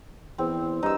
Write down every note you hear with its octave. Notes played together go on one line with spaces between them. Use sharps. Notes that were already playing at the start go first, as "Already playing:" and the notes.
E2 C4
G2 D#4 E6